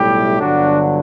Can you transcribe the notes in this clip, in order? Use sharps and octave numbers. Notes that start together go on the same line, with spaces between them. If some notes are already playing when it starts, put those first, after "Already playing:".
Already playing: B1 A2 G3 E4 G4
G1 G2 D3 F#3 D4 F#4